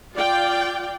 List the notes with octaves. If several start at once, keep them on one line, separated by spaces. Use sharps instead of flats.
F4 D5 F5 G5